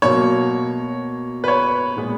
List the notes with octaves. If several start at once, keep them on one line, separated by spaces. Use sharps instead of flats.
B2 F#3 A#3 C#5
B4
C#5
A#2 G#3 B3